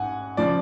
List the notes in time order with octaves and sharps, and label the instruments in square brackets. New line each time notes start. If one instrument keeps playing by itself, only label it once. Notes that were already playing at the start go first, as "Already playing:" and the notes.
Already playing: [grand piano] A1 G#2 F#5 G#5
C#3 F3 D5